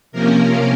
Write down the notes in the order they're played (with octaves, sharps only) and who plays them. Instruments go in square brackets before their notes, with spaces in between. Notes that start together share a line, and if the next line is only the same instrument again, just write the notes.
[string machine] C3 F3 A#3 C#4 A#4